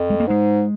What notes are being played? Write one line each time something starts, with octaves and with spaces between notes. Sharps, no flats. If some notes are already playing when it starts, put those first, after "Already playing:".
Already playing: F2
G#3
A#3
G#2 G#3